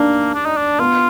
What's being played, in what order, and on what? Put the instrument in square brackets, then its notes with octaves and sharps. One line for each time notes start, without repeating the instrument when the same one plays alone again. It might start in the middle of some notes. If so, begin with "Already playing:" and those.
Already playing: [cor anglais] A#3 [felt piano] D4 D#4
[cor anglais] D4
D#4
D4
[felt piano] B3 [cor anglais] F4